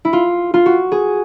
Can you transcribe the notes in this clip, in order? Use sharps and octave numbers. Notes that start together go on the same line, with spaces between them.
E4
F4
F4
F#4
G#4